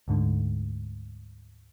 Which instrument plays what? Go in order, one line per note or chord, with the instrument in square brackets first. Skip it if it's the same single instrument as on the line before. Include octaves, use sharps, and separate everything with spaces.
[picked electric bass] D2 G#2 D3